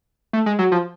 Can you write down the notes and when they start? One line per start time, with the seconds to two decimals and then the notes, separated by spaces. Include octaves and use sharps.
0.33 A3
0.46 G#3
0.59 F#3
0.72 F3